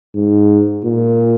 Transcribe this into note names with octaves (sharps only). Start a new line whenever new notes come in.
G#2
A#2